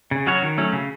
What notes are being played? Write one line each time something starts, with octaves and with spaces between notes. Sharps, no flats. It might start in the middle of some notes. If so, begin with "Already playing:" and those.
C#3
F#3 C#4 F#4 C#5
D#3
F#3 A3 C#4
C#3